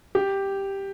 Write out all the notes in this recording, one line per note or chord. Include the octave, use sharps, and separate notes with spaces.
G4